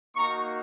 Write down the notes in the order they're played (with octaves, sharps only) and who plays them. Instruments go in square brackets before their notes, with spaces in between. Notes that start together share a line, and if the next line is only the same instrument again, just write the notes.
[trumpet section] A#3 D#4 F#4 A#5 C#6